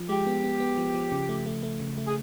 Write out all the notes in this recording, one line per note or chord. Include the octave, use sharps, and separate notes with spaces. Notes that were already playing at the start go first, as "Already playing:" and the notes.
Already playing: F3
G#3 G4
B3
B3
B3
F3
F3
C#3
A3
A3
A3
C#3
A3
G#4